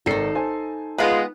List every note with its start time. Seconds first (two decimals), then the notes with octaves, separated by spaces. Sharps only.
0.06 G#1 D#3 D#4 A4 C7
0.35 C5 G#5 A5
0.98 G#3 B3 F4 B4